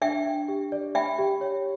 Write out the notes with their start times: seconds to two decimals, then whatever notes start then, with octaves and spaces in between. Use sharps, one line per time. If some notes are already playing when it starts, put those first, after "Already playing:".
0.01 D4 E5 G5
0.24 D4
0.48 G4
0.72 D5
0.95 E5 G5 B5
1.19 G4
1.41 C#5